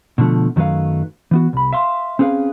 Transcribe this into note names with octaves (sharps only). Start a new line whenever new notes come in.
B2 D3 F3 A3
F#2 D#3 F#3 A3 B4 F5
E3 B3 F#4
C2 B5
E5 F5 C6
C4 C#4 G#4 B4 F5